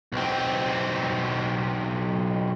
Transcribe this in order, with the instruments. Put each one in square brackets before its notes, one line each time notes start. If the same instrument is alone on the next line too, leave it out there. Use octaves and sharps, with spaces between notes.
[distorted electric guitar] B1 C4